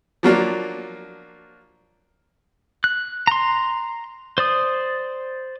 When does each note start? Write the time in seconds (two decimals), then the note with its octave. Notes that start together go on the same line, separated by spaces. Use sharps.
0.23 F3 F#3 A#3 D4
2.84 F#6
3.27 A#5 C6
4.38 C5 D5 D#6